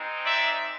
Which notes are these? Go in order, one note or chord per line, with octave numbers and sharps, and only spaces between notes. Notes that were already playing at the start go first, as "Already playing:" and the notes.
Already playing: G#3 C4 D#4
D5 E5